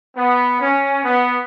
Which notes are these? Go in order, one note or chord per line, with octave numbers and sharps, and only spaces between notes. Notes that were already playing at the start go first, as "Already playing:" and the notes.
B3
C#4
B3